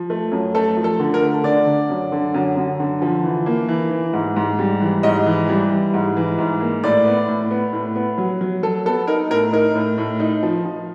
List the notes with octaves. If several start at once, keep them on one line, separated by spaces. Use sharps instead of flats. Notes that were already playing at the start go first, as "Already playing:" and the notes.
Already playing: F3
A3
F#2
A3 A4
F3
A4
D3
A#4
A3
D3 D5
D3
F#2
D3
F#2
F#2
D3
F3
E3
A#3
E3
E3
G#2
G#2
G3
E3
G#2 D#5
E3
G3
E3
G#2
E3
G#2
A#3
A2 D5
B3
A2
B3
A2
B3
F#3
F#3
F#3 A4
B3 A4
D#4 A#4
A2 A#4
D#4 A#4
A2
A2
D#4
F3
F3